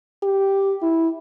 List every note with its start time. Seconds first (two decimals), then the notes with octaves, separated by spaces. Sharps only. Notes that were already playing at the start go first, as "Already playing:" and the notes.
0.23 G4
0.82 E4